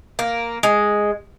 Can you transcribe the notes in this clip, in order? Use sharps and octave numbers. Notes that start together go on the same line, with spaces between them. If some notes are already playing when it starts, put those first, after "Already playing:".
A#3
G#3